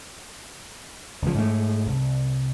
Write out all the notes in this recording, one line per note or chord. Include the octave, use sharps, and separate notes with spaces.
C#2 F3
G#2 A3
C2